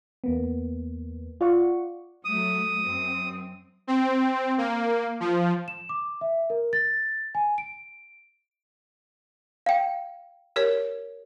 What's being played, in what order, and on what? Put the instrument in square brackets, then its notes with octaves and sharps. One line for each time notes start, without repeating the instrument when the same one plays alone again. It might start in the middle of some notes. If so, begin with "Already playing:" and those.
[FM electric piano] E2 A#3 B3
F4 D5 F#5 C#6
[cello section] F#3 A3 [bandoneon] D#6
[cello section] F#2 C4
[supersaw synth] C4
A#3
F3
[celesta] E7
D6
E5
A#4
A6
G#5
D7
[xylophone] F5 G5
[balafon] G4 A#4 C#5